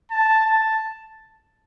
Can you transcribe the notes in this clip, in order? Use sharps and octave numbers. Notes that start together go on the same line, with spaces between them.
A5
A5